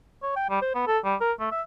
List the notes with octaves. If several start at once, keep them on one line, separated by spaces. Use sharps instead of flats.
C#5
G5
G3
C5
B3
A4
G3
A#4
A3
E5